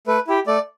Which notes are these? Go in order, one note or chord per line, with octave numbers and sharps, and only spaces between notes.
A3 B4
E4 G4
A3 D5